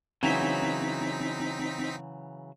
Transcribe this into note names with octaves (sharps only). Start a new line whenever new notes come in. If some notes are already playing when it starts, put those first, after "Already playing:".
C#3 E3 F#3 C4 D#4 B6